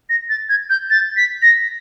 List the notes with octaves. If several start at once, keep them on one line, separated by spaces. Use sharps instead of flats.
A#6
A6
G#6
G6
A6
B6
A#6